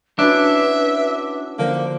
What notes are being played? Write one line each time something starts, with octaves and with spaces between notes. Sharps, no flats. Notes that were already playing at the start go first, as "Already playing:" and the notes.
C#4 D4 E4 F#4 B4 E5
D3 F3 A#3